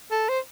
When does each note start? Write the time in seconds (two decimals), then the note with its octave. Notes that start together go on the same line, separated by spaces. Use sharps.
0.11 A4
0.29 C5